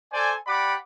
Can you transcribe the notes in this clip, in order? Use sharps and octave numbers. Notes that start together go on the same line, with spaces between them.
A4 C5 D5 G#5
G4 D5 F#5 B5 D6